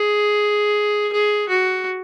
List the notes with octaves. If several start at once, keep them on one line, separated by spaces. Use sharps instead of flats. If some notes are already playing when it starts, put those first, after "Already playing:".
Already playing: G#4
G#4
F#4